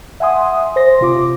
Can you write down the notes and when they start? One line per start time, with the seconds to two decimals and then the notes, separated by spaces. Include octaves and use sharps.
0.20 E5 F#5 G#5 C6 D#6
0.76 C5 C6 A#6
1.01 C3 F4 D6